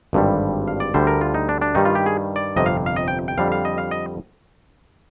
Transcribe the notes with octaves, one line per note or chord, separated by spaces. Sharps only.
G#1 G2 D3 G3
F5
D5
D2 D3 G3 C5
A#4
F4
D#4
D4
D4
G2 D#3 G3 D#4
F4
G4
G#4
D5
G1 F2 C3 D#5
F5
F5
D#5
G5
G5
F2 D3 G3 F5
F5
D#5
F5
D#5